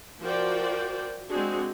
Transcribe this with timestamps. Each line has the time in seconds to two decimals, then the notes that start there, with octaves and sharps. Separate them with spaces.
0.23 F3 F#4 A#4 C5 D5 G5
1.30 G#3 C4 D4 F#4 G#4